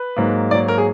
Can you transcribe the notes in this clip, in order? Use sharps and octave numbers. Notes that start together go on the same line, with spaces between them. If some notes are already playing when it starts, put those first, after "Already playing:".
Already playing: B4
G#2 F#3 A#3
G#2 F#3 A#3 D5
A#4
G#4